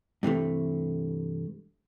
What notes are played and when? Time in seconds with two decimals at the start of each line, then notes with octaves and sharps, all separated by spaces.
0.23 G2 C3 E3 A3